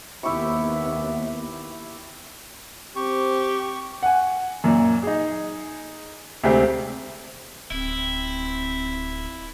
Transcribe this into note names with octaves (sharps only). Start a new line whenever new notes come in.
D#2 B3 E4 G4 E5 C#6
C4 G4 C#6
F#5 G#5
F#2 A#2
D#4 G#4
D2 C3 G#3 C4
D1 C4 E4